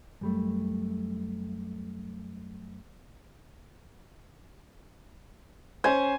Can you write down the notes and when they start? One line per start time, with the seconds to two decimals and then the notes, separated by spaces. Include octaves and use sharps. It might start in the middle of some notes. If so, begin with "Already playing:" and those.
0.21 F#2 G3 A3
5.84 C#4 C5 G#5